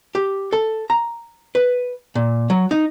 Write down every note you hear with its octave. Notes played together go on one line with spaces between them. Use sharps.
G4
A4
A#5
B4
A#2
F#3
D#4